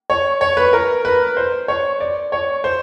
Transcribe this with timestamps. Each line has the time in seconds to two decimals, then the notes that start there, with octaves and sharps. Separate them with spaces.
0.10 C#5
0.41 C#5
0.57 B4
0.73 A#4
1.05 B4
1.37 C5
1.68 C#5
2.00 D5
2.32 C#5
2.64 C5